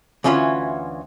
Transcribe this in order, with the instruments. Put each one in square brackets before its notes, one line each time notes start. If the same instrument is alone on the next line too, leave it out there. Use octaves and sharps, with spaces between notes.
[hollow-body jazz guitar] D2 E3 C#4 F4 F#4